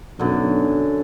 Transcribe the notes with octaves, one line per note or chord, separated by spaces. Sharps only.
B1 F#2 D3